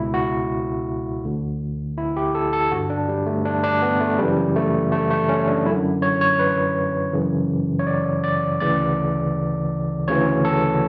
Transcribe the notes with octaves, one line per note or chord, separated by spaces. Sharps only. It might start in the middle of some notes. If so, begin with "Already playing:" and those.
Already playing: C#2 B2 E4
F#4
D2 D3
E4
G4
A4
A4
G2 D3 F#4
D4
G3
A3
D4
D4
B3
A3
F#2 C#3 E3 G3
A3
A3
A3
C#4
D4
F#2 D3 E4
C#5
C#5
B4
F#2 C#3 E3
C#5
D5
D5
D2 C#3 E3 D5
D2 C#3 E3 C#5
A4